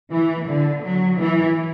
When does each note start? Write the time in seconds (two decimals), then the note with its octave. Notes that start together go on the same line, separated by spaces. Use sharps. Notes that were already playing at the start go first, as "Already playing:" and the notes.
0.11 E3
0.46 D3
0.82 F#3
1.18 E3